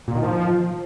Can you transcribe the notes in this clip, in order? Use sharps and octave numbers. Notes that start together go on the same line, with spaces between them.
A#2
D#3
F3